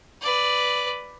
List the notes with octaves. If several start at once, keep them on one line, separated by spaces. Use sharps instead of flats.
B4 D5